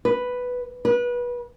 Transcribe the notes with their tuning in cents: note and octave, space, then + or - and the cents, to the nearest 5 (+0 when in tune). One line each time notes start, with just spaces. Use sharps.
B4 +0
B4 -25